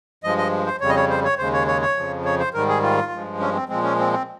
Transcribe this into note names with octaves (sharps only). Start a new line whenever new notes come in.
G2 F3 G#3 D#5
D#5
C5
F2 C#3 G3 C#5
D#5
C#5
C5
C#5
D#2 C#3 G#3 C5
C#5
C#5
C#5
F2 C#3 F3
C#5
C5
G#2 D#3 G3 A#4
G#4
F4
G2 F3 G#3
C#4
C4
A#2 F3 G#3 C4
C#4
C4
C4